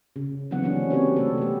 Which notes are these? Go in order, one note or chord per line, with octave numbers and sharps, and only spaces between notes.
C#3
D3 E3 F#3 B3 C4 F#5
F#3 A#3 B3 C#4 D4
C4 G4 B4 C#5
C3 A3 A4
B3 G4